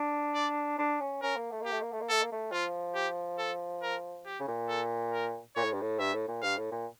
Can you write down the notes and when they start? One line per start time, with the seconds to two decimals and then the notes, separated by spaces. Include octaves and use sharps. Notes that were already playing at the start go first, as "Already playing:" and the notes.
Already playing: D4
0.34 D5
0.78 D4
1.00 C#4
1.22 C#4 A#4
1.36 A#3
1.51 A3
1.61 A#3 G4
1.72 A3
1.82 A#3
1.92 A3
2.01 A#3
2.09 A3 A4
2.21 A#3
2.32 A3
2.52 F3 F4
2.95 G4
3.39 A4
3.82 A#4
4.26 G4
4.40 C#3
4.47 A#2
4.69 A4
5.13 A#4
5.56 A#2 C#5
5.64 A2
5.72 G2
5.81 A2
5.99 G2 E5
6.13 A2
6.28 A#2
6.42 G2 F5
6.57 A2
6.71 A#2